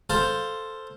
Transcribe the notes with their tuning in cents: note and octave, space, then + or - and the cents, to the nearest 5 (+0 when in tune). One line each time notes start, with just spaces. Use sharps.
A4 +0 C5 +0 F5 +0